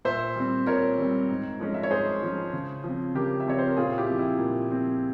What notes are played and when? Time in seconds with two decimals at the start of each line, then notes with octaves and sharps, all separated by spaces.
0.05 A#2 C5 E5
0.36 G3 C4
0.66 A#2 A#4 C#5
0.98 G3 C4
1.29 G#2
1.60 F3 G#3 C#4
1.74 E5
1.83 C#5
1.91 G#2 G#4 C5
2.22 F3 G#3 C#4
2.53 C#3
2.84 F3 C4
3.15 C#3 G4 A#4
3.40 E5
3.46 F3 C4 C#5
3.59 C5
3.68 A#4
3.77 A#2 F4 G#4
3.98 E4 G4
4.09 F3 C4
4.19 E4
4.39 A#2
4.70 F3 C4